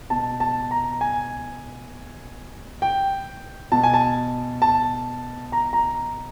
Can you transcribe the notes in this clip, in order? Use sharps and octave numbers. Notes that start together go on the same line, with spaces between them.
B2 A5
A5
A#5
G#5
G5
B2 A5
G#5
A5
A5
A#5
A#5